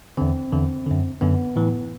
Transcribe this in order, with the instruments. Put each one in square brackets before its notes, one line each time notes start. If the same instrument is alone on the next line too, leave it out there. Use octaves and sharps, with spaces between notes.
[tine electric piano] E2 D3 C4
E2 D3
F#2 D3
F#2 D3 B3
A2 E3